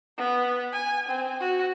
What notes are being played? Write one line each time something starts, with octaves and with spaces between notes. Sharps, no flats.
B3
G#5
C4
F#4